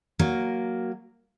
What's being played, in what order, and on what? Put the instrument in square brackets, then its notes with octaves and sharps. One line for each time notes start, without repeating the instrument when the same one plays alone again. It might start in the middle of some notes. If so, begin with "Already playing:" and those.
[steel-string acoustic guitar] F#3 A#3